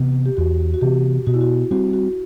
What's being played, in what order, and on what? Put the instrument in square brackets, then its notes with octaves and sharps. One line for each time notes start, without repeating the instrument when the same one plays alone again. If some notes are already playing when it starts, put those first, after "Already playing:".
Already playing: [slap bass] C3 E3 B3
[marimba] G4
[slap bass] E2 [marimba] F#4
[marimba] F#4
[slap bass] C3 E3 B3 [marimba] G4
[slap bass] B2 [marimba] F#4
[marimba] E4
F#4
[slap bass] G3 C4 [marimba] F#4
[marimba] F#4